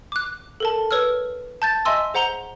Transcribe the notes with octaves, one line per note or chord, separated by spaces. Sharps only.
D6 F#6
A4 A#4 A5
B4 C#5 E6 F6
A5 G6 A6
D#5 E5 G#5 C6 E6
G#4 C5 F#5 A#5 F7 G7